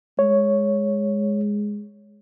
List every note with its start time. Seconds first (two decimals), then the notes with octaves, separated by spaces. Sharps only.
0.19 G#3 C#5